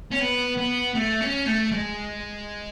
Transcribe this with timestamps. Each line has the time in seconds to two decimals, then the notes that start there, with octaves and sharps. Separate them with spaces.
0.11 C#4
0.19 B3
0.57 B3
0.95 A3
1.21 C#4
1.46 A3
1.71 G#3